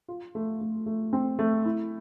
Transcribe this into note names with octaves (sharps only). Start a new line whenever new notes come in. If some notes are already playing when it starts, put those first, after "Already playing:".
F4
A3
A3
A3
C4
A3
E4